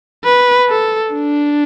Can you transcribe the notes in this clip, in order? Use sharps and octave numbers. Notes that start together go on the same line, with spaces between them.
B4
A4
D4